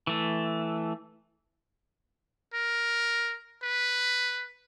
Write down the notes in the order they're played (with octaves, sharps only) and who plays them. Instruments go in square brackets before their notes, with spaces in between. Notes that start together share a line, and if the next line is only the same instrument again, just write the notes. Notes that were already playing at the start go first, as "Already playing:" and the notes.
[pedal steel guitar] E3 A3
[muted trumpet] A#4
B4